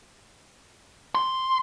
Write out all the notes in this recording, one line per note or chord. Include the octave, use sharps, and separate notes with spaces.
C6